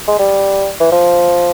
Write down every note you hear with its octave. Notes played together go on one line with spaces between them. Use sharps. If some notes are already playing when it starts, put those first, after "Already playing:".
G#3
G3
E3
F3